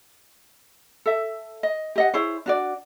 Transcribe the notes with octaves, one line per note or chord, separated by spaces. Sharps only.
A4 E5
D#5
G4 D#5 F#5
E4 G#4 C5 C#5
D4 F#4 D5